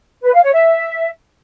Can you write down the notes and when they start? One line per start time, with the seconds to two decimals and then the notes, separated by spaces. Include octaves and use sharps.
0.23 B4
0.33 F5
0.43 C#5
0.53 E5